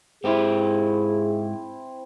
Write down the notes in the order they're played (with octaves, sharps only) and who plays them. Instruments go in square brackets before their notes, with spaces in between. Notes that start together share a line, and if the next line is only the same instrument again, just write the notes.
[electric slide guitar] G#2 G4 G5 [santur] C4 E4 D6 [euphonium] G#4